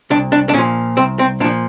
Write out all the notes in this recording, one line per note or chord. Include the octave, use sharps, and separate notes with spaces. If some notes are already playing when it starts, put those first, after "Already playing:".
C2 D4
D4
D4
A#2 F3 C#4
C2 C4
C4
A#2 F3 D4